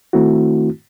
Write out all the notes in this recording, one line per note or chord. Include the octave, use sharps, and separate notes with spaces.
D#3 A3 C4 E4 F#4